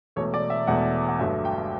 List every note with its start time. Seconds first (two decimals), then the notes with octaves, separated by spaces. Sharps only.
0.16 E1 E2 B2 A3 C#5
0.34 D5
0.50 E5
0.67 E1 E2 B2 A3 F#5
1.08 F#5
1.19 G1 G2 F#3 A3 E5
1.45 G5